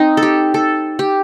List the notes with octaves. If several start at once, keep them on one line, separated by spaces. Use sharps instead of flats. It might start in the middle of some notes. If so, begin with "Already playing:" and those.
Already playing: C4 D#4
A4
G4
A4
G4